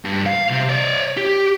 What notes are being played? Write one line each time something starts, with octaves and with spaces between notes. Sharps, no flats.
G2
F5
C3 C4
C#5 D5
G4